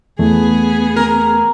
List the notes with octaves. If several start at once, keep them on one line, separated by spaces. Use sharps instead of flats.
E2 A3 B3 G#4
A#4